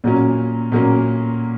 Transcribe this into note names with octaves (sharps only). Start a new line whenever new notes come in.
A#2 F#3 A#3 C#4
A#2 F#3 A#3 C#4